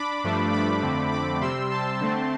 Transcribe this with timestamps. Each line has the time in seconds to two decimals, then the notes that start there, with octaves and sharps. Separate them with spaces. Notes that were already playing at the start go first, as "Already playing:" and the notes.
Already playing: D4 B5 D6
0.24 G2 F3 A3 D4
0.52 B5 D6
0.82 F2 D3 A3 C4
1.12 B5 D6
1.41 C3 G3 C4 C6 E6
1.71 A5 C6
2.00 D3 A3 C4